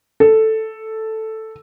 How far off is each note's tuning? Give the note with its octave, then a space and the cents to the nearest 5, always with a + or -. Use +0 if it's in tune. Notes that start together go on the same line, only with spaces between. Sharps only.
A4 +0